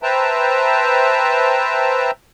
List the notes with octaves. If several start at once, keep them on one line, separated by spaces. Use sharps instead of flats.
B4 C5 E5 G5 A5 A#5